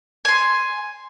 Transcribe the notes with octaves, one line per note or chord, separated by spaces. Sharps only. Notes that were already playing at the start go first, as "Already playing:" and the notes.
G#5 C6